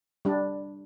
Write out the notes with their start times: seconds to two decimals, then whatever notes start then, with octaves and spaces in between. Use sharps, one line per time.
0.25 G3 D4